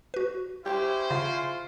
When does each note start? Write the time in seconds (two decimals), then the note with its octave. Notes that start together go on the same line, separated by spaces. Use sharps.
0.14 F#4 B4
0.65 C#4 E4 G4 C5
1.11 C#3 F4